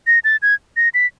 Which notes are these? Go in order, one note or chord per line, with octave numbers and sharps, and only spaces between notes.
A#6
A6
G#6
A#6
B6